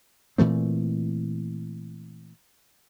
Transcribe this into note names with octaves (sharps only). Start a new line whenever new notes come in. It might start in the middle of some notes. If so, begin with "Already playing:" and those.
A#2 E3 A3 C4